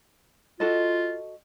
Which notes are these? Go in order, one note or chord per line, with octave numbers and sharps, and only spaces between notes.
F4 F#4 A4 D#5